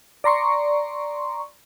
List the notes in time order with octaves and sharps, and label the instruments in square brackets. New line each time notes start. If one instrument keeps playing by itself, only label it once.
[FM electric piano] D5 A#5 C6 C#6